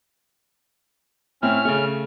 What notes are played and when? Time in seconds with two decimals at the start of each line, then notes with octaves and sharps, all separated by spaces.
1.42 A2 C4 C#4 E4 F6
1.65 C#3 A3